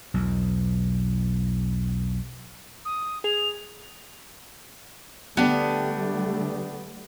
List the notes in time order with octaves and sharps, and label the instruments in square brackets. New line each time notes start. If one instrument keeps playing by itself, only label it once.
[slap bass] B1 E2
[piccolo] D#6
[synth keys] G#4 [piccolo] F7
[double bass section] D3 G3 A3 [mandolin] B3 [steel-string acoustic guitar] D4 G4